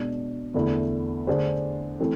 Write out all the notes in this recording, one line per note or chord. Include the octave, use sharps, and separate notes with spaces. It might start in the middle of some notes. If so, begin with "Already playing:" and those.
Already playing: B2 G#3 D4
E2 D3 A3 E4
D3 A3 D4 G#4 C5
E3 A3 C4